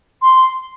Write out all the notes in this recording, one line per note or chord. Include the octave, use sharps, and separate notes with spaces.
C6